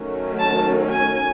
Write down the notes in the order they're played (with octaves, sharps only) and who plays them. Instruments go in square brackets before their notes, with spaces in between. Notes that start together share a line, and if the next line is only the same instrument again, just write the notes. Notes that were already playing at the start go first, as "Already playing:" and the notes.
Already playing: [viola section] D#3 F#3 A3 C#4
A5
G#5